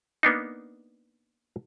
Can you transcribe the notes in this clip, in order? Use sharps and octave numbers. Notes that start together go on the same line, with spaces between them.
A#3 B3 D4 D#4